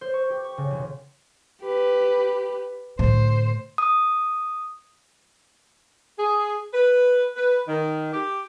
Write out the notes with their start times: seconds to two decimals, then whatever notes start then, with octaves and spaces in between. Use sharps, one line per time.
0.01 C5
0.14 C#6
0.30 G4
0.44 C#6
0.58 C#3
0.71 E1
1.63 G4 B4
2.99 A2 D3 C5
3.78 D#6
6.17 G#4
6.72 B4
7.35 B4
7.67 D#3
8.12 G4